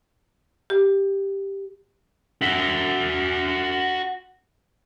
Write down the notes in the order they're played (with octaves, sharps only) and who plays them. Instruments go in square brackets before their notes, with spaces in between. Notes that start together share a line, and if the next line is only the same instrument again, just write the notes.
[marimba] G4
[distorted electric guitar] F#4 E5